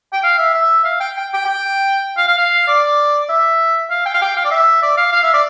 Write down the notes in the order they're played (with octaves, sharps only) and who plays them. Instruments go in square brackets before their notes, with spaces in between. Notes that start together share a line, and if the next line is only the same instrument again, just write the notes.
[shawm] G5
F5
E5
E5
F5
G5
G5
G5
G5
F5
F5
F5
D5
E5
F5
G5
F5
G5
F5
D5
E5
D5
F5
F5
E5
D5